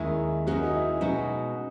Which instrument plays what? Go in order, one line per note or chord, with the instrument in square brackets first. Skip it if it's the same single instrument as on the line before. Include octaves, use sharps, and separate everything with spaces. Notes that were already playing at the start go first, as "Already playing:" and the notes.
Already playing: [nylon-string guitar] D#2 D#3 G#3 C#4 G#4 [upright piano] E4
[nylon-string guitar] D#2 D#3 G#3 C#4 G#4 [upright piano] F#4
[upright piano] D#4
E4
[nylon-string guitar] B2 G#3 C#4 F#4 [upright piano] D#4